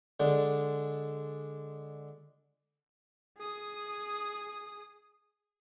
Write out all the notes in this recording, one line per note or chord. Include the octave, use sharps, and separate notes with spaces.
D3 G#3 D4
G#4 D#6